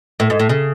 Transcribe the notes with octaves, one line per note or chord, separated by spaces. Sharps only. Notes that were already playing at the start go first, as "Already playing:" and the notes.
A2
G#2
A2
C#3